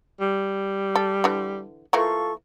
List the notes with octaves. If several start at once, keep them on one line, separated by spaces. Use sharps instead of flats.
G3
A4
D3 E3
E3 A3 A#3 F4 A4 C#6